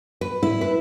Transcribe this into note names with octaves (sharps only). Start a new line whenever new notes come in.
B4
E4
B4